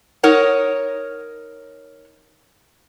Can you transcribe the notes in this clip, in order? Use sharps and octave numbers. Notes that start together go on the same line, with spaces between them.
D#4 A#4 C#5 F#5